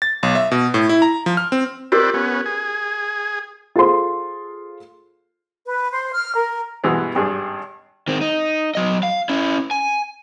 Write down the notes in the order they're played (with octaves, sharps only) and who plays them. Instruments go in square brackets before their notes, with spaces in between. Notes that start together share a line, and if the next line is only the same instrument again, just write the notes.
[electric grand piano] A6
B1
E5
B2
A2
E4
A#5
F3
F6
C4
[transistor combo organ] C4 B4 D5 [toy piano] F4 G4 A#4
[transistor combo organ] B3 C#4
G#4
[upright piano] F4 G#4 A4 C5 F5 C6
[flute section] B4
C5
F6
A#4
[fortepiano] G2 B2 E3 G#3 B3
G#1 G2 D4 G#4
[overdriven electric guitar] D#3 C4
D#4
F#3 D#5
F5
C#4 E4
G#5